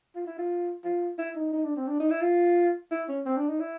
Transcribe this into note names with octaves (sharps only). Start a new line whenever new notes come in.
F4
E4
F4
F4
E4
D#4
D#4
D4
C4
D4
D#4
E4
F4
E4
C#4
C4
D4
D#4
E4